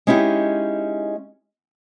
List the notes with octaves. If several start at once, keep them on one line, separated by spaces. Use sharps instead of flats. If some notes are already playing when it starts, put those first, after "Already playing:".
G#3 C#4 D#4 E4 G4